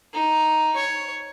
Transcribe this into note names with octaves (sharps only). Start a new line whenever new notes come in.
D#4
C#5